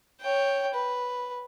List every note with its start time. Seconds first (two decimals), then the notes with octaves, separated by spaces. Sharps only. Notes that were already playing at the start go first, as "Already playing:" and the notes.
0.21 C#5 G5
0.74 B4